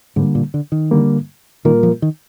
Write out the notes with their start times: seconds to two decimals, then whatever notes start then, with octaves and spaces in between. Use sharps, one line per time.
0.16 G#2 D3 G3 A#3
0.35 A#2
0.54 D3
0.72 D#3
0.91 D3 G3 A#3
1.65 A#2 D#3 G3 A#3 F4 A#4
1.83 F3
2.02 D#3